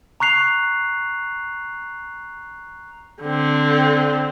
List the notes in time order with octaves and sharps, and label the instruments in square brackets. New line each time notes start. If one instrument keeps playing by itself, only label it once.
[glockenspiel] A#5 C#6 F#6 C7 F7
[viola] D3 C4